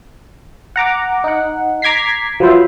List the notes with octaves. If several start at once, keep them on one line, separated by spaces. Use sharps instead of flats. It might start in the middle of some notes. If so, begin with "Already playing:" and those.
F#5 A#5 D6
D#4 F#5
A#5 D6 G#6 B6 C7
F3 F#3 B4 C5 E5